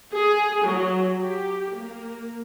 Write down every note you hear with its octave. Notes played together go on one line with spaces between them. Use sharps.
G#4
F#3
G4
A#3